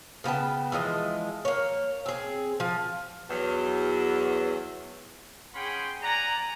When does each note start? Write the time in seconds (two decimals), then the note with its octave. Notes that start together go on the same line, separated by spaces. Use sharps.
0.24 C#3 B3 G5 A5
0.72 E3 F3 G#3 D#5
1.45 A#3 C#5
2.06 C4 G#4
2.60 F3
3.29 E2 F#3
5.54 C#4 G#4 F#5 G5 B5 C6
6.02 D5 F#5 G#5 A#5